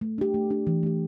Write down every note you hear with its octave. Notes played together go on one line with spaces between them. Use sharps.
A3
D4 G4
A3
D4 G4
E3
A3 G4